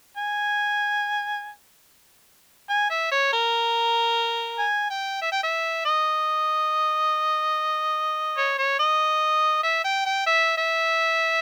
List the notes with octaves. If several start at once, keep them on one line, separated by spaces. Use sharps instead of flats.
G#5
G#5
E5
C#5
A#4
G#5
G5
E5
G5
E5
D#5
C#5
C#5
D#5
E5
G5
G5
E5
E5